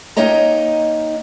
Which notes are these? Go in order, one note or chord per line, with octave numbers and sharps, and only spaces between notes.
A#3 D#4 G4 C#5 D#5 A#5